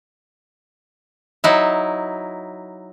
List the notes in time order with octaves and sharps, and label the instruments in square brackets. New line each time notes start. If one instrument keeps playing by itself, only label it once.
[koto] F#3 D#4 E4